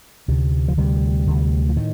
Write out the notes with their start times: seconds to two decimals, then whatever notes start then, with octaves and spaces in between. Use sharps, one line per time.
0.28 D2 C3
0.68 F3
0.77 D2 C3 G3
1.27 D2 C3
1.69 F3
1.76 A2 D#3